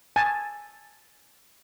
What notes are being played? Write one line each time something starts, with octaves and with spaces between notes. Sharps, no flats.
G#5 A5